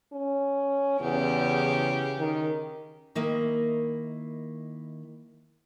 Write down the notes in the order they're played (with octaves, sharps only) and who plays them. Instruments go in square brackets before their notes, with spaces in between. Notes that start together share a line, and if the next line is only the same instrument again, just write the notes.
[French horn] C#4
[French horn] E2 [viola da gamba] C#3 C#4 G4
[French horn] D#3
[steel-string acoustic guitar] D#3 A#3 E4 D#5